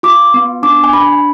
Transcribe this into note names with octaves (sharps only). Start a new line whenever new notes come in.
F4 D6
B3
D4 D6
G#5
D4 B5